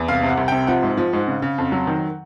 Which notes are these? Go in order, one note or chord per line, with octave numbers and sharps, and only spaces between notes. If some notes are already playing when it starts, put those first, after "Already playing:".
Already playing: E2
C2 F5
C3 F#5
C2
C3 G5
F3 F#5
G#2
F3
G#2
C#3
C#3
F2
F#3
D#3